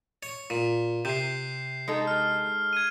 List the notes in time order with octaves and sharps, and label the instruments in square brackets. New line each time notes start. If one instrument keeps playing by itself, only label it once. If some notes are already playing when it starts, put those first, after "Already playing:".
[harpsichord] C#5
A#2
[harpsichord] C3 [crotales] G6 C7
[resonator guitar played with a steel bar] G#3 D#4 A4
[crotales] F6
G#6 D#7